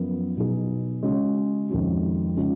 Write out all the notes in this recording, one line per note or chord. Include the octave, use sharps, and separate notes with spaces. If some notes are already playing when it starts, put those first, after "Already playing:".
Already playing: F#2 F3 B3
B2 F#3 B3 D#4 G#4
C#3 G#3 C#4 F#4
F2 D#3 G#3 C#4 F#4
C#3 G#3 C#4 F4